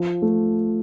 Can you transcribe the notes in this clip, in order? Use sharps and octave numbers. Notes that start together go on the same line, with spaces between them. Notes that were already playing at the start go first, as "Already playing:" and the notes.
Already playing: F3
A3